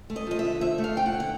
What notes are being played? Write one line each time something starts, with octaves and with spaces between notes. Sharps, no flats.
A3
D#5
F3 D#5
E5
D3
F3 E5
A3
F5
D#2 G5
F#5
D3
F#5